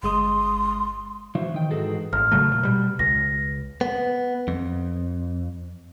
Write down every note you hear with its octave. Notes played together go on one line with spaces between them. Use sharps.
G1 G#3 C6 D#6
E3 F#3 C5
D#3 G5
G#2 E3 D#4 F#4 G#4 A4
A1 F6
C#3 F#3 A3
A#2
B2 G3
C#2 A#6
B3
F2